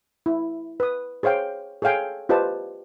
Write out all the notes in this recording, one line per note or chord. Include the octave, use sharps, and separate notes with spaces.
E4
B4 D#6
G#4 C5 C#5 F5 G5
G#4 A4 C#5 F5 G5 G#5
F4 G4 B4 C5 D#5 A5